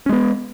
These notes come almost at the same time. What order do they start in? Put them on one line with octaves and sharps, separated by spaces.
C#4 G#3 B3